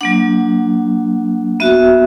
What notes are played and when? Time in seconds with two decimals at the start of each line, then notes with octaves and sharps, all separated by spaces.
0.01 F#3 A#3 D4 F#5
1.60 B3 F#4 E5